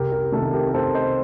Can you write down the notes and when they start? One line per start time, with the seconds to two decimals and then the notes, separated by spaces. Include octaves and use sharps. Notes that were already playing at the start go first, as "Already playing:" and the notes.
Already playing: C2 G4 A#4
0.11 G4 A#4
0.32 C3 D#3 A#3 A4
0.53 G4 A#4
0.69 A#4
0.74 C2 A4 C5
0.94 C5 D#5